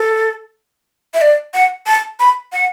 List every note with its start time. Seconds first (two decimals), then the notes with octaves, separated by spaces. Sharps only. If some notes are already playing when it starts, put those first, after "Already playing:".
Already playing: A4
1.14 E5
1.21 D5
1.54 F#5
1.87 A5
2.20 B5
2.53 F#5